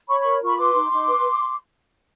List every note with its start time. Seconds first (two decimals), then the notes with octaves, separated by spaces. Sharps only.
0.08 C#5 B5 C#6
0.20 A#4 B5 C#6
0.42 F4 B5 C#6
0.57 B4 C6 D6
0.74 D#4
0.91 D#4
1.08 B4